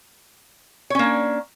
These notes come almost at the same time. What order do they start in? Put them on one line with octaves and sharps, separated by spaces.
C#5 C#4 A#3 D4